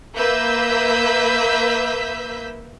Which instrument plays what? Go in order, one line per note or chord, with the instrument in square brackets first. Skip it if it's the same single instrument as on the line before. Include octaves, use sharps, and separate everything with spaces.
[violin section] A#3 B4 E5 E6 G6 B6